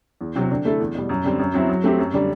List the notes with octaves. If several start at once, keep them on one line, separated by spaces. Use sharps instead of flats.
E2
C3 F#3 C4
D3
A3 E4 A4
E2
B2 G3
F#2
D3 G3 C4
F#2
F#3 C4 E4
F#3
A3 C4 G4
F#2
D3 G3